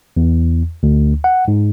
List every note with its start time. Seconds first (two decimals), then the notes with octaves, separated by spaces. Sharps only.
0.17 E2
0.83 D2
1.24 F#5
1.48 G#2